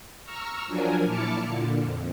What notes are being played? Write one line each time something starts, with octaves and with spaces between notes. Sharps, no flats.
A#5 C#6 E6 F6
F3 F#3 D4 A#4 G#5
A#2 E4 A5 D6 F6 C#7
A#2 D3
F2